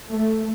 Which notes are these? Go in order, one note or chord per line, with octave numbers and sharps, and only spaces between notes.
A3